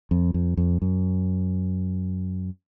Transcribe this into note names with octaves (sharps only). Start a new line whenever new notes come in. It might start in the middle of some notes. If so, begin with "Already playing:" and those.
F2
F2
F2
F#2